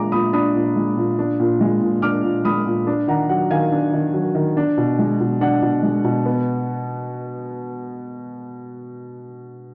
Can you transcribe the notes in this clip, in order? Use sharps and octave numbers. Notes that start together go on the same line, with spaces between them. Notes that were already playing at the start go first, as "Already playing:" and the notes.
Already playing: A#2 G#3 D4 A#5 D6
A#2 B5 D#6
D4 B5 D#6
A#2
G#3
A#2
D4
A#2
G#3
A#2
D4 D6 F6
A#2
G#3 B5 D#6
A#2
D4
D#3 F#5 A#5
F#3 F#5
D#3 F5 G#5
D4
D#3
F#3
D#3
D4
B2
G#3
B2
D4 F#5
B2
G#3
B2
B3